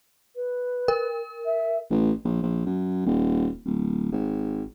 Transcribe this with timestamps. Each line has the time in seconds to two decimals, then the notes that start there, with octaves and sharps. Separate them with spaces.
0.36 B4
0.88 A#4
1.45 E5
1.91 A1
2.24 A#1
2.42 A#1
2.66 F#2
3.06 D#1
3.65 D1
4.12 G#1